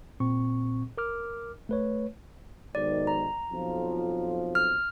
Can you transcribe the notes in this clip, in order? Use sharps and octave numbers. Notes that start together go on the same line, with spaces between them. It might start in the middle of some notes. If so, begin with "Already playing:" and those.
A#2 C4 C#6
A#4 D6 F6
A3 B4 C#5
B1 G#2 D#3 D5
A#5
B1 F2 F3
F6